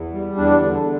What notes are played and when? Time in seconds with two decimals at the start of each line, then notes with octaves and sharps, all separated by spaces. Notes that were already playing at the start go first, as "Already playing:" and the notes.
Already playing: E2
0.13 G3
0.37 E2 D4
0.61 D3